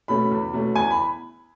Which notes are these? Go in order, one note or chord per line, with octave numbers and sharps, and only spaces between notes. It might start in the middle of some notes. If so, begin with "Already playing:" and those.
B2 A3 C#4 B5
E2
B2 A3 C#4
E2 G#5
B5